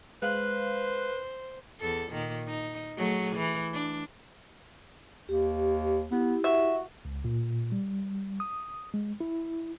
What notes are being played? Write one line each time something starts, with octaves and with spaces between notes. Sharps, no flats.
G#3 B4 C5 F5 F#6
E2 A4
A#2 D#3
D#4
F#3 A3 G#4
E3
D4
D#2 G4
B3 E4 G4
F#4 E5
C#2
A#2
G3
D#6
G#3
E4